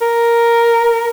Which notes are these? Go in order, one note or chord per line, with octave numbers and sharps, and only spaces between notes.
A#4